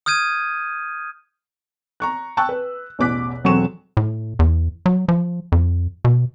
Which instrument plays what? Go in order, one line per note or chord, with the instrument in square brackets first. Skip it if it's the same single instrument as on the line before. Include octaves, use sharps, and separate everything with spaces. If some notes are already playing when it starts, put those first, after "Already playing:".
[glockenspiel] D#6 F6 G6 G#6 D#7
[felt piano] A#5 C#6 F#6
G5 A5 C#6 E6 F#6
B4
A1 E2 B2 D6 F#6 B6
E1 F#3 C4 A4 C#6 E7
[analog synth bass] A2
E2
F#3
F3
F2
B2